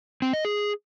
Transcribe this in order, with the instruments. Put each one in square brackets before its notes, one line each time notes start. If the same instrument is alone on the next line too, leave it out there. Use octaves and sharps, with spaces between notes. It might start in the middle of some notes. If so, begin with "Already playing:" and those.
[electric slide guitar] C4
D#5
G#4